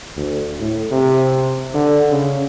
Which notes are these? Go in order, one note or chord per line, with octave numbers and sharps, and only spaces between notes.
D2
A2
C3
D3
C#3